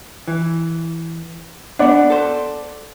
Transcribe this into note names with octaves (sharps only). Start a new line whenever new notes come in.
E3
B3 D4 D5 F#5
A4 C5